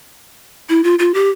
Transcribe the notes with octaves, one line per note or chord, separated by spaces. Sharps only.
E4
F4
F4
G4